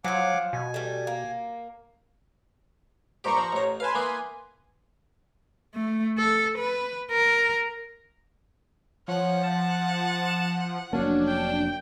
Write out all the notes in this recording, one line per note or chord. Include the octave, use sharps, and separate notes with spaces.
F3 F#3 F4 F#5 G#5 D6
B2 G#5
G3 A3
A#3
G2 A#2 G4 C5 A#5 C#6
F3
A1 C#5
B4 F5 G#5 A5 C6
E3 A#3 B3
A3
A4
B4
A#4
F3 C#5 F#5
A5
F1 F#3 A#3 C#4 D4
G5